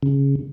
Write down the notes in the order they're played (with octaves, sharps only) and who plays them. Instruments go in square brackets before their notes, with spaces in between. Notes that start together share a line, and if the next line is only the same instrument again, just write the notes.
[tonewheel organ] C#3